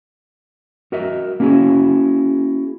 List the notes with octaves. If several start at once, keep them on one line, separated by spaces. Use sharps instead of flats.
F#4 A#4 D#5 E5
A#3 C#4 E4 F#4 G#4